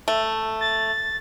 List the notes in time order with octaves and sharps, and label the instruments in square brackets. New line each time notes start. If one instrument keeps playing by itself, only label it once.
[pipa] A3
[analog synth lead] A6